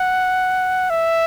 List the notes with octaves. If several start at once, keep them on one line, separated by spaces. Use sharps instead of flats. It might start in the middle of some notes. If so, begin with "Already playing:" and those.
Already playing: F#5
E5